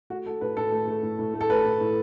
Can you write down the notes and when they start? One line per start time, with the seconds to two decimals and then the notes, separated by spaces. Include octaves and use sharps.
0.10 A3 F#4
0.26 A3 A4
0.41 A2 B4
0.57 A2 A4
0.72 A3
0.87 A3
1.03 A2
1.19 A2
1.34 A3
1.41 A4
1.50 A3 B4
1.65 A2
1.81 A2